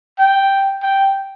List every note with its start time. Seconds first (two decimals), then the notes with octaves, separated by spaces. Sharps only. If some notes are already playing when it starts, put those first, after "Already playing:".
0.19 G5
0.83 G5